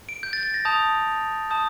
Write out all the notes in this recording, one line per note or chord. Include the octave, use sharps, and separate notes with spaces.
D7
G6
A6
A6
A#6
A5 D#6 G6 F7
A5 D#6 G6